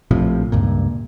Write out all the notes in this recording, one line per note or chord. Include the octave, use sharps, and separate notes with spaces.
A#1 A2 C3 F3
C#2 G2 A#2